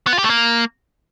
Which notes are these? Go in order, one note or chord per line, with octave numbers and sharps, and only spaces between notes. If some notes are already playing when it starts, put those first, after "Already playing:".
B3
F4
G4
A3
A#3